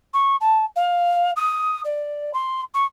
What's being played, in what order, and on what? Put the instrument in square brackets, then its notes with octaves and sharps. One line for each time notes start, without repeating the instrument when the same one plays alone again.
[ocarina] C#6
A5
F5
D#6
D5
C6
C#6